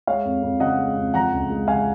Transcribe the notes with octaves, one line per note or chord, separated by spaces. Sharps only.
G#3 C#5 F5
F2
F2
C#3 D#5 F#5
G#3
F2
F3 F#5 A#5
C#2
G#3
C#3 F5 G#5